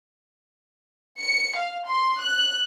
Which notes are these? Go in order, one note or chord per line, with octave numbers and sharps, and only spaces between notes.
C#7
F5
C6
F#6